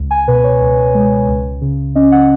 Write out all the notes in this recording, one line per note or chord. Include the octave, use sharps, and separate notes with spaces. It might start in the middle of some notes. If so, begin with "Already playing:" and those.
Already playing: C#2
G#5
B2 B4
C#5
C#2
G#3
C#2
C#3
C#4 D#5
F#5